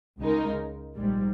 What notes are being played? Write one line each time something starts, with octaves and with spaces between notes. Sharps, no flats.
C#2 C#3 G#3 D#4 A#4
A#1 G#2 G3